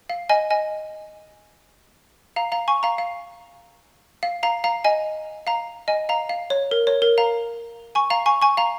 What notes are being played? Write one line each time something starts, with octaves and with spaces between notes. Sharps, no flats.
F5
D#5 G#5
D#5 G#5
F5 A#5
F5 A#5
G#5 C#6
F5 A#5
F5
F5
F5 A#5
F5 A#5
D#5 G#5
F5 A#5
D#5 G#5
F5 A#5
F5
C#5
A#4
C#5
A#4
F5 A#5
G#5 C#6
F5 A#5
G#5 C#6
G#5 C#6
F5 A#5